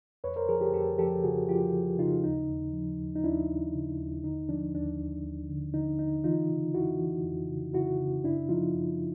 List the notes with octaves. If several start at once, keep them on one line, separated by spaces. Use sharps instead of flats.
F2 B4 C#5
A#4 C5
F3 G#4 A#4
G4 A4
F2 G4 A4
F3 G4 A4
C#3 F#4 G#4
F3 F4 G4
F3
C#3 D#4 F4
D#2 D#4
D#2
F3
D#2
D#4
D#2 D4 E4
D#2
C#3
D#2
D3 D#4
F3 D4
D#2 D4
D#2
D#2
D3
D3 D#4
D3 D#4
E3 D#4 F4
C#3
F2 E4 F#4
E3
F2
C#3
C#3 E4 F#4
C#3
F#2 D4 E4
F3 D#4 F4
F#2